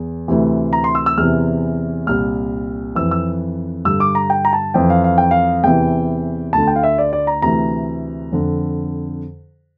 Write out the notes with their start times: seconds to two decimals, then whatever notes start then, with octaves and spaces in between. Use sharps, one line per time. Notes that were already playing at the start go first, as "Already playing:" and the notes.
Already playing: E2
0.28 D2 C3 E3
0.73 A#5
0.84 C6
0.95 E6
1.06 E6
1.18 E2 C3 E3 F6
2.07 C2 A#2 F6
2.95 F2 E3 E6
3.11 E6
3.85 G2 D3 E6
4.00 D6
4.15 A#5
4.30 G5
4.45 A#5
4.53 A5
4.74 F2 E3 G5
4.90 F5
5.04 F5
5.18 G5
5.31 F5
5.64 E2 C3 E3 G5
6.53 D2 D3 A5
6.67 G5
6.76 F5
6.83 E5
6.98 D5
7.13 D5
7.27 A#5
7.42 D2 C3 E3 A#5
8.32 F2 D3